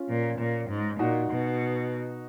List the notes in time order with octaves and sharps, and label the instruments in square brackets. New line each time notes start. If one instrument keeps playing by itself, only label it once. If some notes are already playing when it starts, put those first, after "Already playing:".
Already playing: [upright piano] C#4 F4
[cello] A#2
A#2
G#2
[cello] A#2 [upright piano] D#4 F#4
[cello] B2